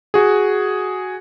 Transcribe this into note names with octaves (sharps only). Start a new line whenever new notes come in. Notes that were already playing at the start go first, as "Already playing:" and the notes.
F#4 G#4